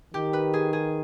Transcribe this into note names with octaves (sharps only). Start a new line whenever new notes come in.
D#3 G4
B4
G#4
G#4